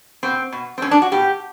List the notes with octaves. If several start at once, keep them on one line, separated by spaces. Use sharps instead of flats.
B2 C4
B2
C4
B2 C#4
D4
F#4
B2 G4